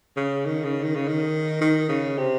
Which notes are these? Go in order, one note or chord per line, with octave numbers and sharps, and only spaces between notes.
C#3
D#3
C#3
D#3
C#3
D#3
D#3
C#3
C3